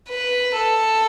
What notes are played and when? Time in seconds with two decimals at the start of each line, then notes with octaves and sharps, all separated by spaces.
0.09 B4
0.55 A4